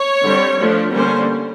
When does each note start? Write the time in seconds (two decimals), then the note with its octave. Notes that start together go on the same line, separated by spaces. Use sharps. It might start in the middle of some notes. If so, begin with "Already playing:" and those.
Already playing: C#5
0.24 D3 G3 C4
0.59 F3 A3 D4
0.94 D3 G3 A#3 C#4 C5